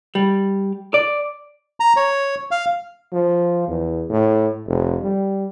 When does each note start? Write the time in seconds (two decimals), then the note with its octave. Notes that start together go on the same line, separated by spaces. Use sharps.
0.15 G3
0.94 D5
1.80 A#5
1.97 C#5
2.51 F5
3.12 F3
3.68 E2
4.10 A2
4.67 F1
5.02 G3